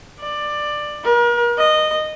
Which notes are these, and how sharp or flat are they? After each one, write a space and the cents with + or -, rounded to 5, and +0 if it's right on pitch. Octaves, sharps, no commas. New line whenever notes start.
D5 +15
A#4 +40
D#5 -15